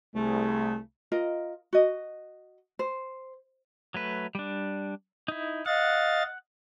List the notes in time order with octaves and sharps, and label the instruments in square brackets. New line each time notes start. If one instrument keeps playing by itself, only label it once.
[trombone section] C2 G#4 [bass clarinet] A3
[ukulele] F4 A#4 D#5
F#4 D#5
C5
[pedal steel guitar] F#3 A3 B4
G3 D4
D#4 E4
[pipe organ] D#5 F5 A6 [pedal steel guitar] F#5